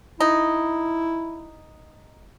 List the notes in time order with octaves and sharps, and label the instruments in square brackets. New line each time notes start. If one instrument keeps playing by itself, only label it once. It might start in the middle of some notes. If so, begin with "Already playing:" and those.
[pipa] D#4 [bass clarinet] E4